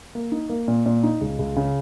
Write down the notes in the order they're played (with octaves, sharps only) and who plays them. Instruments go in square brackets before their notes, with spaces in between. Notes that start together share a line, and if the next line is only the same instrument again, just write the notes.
[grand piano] A#3
D#4
A#3
A#2
A#2
D#4
C#2
C#2
C#3